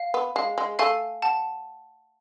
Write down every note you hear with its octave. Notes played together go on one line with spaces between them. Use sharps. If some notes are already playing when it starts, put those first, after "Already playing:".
Already playing: F5
B3
G#3 F5
G#3
A3 F5 G#5
F#5 A5